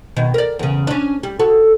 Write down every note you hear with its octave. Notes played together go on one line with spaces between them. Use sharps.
B2 D#3
A#4 D5
E2 C#3
C#4 D4
G3
F#4 A4